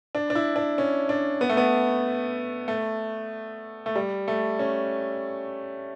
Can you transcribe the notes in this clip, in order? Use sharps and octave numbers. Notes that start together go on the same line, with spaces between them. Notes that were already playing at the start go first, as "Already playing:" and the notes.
D4
D4
E4
D4
C#4
D4
B3
A3
B3
A3
A3
G3
A3
C#4